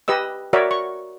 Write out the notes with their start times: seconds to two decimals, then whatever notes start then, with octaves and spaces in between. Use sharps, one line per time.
0.08 G4 B4 D#5 E6
0.53 F#4 A#4 C#5 D5 E5
0.71 C#6